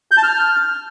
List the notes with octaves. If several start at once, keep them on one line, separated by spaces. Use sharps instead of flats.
G6
A5
F6